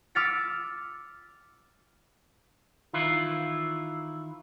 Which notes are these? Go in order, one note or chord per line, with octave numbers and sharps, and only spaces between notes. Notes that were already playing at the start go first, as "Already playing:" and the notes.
D6 E6 F6 A6 B6 C#7
D#3 E3 E4 F4